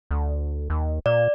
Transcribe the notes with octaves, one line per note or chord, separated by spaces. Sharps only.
D2
D#2
A#2 D5